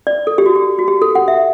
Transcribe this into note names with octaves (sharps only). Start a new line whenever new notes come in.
D5
A4
G4
F#4
G4
F#4
G4
A4
F#5
E5